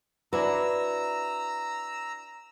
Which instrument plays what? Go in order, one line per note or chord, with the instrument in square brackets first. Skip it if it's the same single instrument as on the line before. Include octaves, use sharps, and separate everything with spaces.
[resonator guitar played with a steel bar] D4 E4 F#4 [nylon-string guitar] B4 [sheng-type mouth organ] A#5 E6